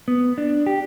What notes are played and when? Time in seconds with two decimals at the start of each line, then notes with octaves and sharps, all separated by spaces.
0.08 B3
0.38 D4
0.66 G4